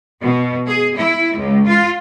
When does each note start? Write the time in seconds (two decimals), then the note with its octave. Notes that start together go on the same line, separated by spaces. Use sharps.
0.23 B2
0.67 G#4
0.98 E4
1.37 C#2
1.67 F4